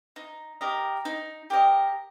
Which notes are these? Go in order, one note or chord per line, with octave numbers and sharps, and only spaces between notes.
D#4
G4 A#4 D#5
D#4
G4 A#4 D#5